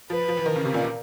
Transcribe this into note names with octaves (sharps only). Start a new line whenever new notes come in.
F3 B4
F3
E3
D#3 A#4
C#3
C3
A#2